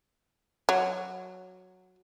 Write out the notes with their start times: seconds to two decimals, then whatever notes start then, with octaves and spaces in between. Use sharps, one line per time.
0.69 F#3